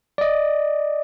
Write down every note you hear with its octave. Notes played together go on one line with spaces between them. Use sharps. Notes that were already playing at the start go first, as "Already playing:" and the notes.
D5 D#5